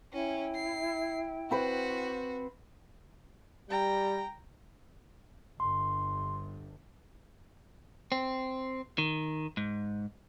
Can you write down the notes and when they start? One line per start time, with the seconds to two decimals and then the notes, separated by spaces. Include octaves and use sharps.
0.13 C#4 E4 G5
0.55 C7
1.51 C4 F#4 B4 C5
3.70 G3 G5 A#5
5.60 G1 G2 C6
8.12 C4
8.98 D#3
9.57 G#2